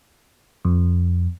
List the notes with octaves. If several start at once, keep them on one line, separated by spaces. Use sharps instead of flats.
F2